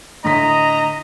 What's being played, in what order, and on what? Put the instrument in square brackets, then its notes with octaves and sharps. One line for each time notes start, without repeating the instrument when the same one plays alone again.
[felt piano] A2 D3 B6 [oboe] D#5 [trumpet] A#5